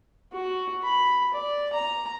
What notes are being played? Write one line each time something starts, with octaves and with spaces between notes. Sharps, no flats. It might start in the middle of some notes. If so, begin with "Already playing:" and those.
F#4
B5
D5
A#5